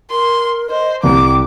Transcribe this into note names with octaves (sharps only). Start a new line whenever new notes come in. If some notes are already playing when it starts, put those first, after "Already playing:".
A#4 C6
C5 D#5
C2 G5 D6